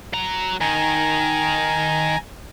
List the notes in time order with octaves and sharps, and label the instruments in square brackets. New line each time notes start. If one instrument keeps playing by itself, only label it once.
[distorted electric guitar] F#3 A#5
[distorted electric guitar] D#3 [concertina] G#5 A#5